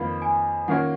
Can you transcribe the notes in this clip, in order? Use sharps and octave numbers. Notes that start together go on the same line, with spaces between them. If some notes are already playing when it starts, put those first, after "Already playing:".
Already playing: F2 D#3 A#3 F4 B4 B5
G#5
D#3 A#3 C#4 F4 A#4 F#5